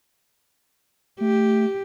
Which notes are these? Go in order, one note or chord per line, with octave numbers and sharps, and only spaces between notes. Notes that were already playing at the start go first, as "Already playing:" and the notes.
A3 G4